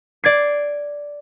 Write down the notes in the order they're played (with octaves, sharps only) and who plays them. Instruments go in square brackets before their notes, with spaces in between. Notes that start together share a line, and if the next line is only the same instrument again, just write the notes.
[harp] D5 G#6 C7